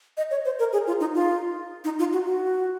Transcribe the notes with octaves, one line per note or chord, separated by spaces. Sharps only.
D#5
C#5
C5
A#4
G#4
F4
D#4
F4
D#4
F4
F#4
F#4